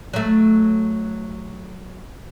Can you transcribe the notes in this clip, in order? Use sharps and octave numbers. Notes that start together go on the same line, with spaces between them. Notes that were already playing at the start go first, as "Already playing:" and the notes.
F#3 A3